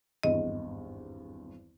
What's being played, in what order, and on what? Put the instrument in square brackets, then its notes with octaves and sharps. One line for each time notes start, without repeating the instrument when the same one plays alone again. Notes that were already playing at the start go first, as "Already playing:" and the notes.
[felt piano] G#1 E2 G2 [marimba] D#5